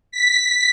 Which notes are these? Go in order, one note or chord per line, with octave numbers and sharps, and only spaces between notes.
B6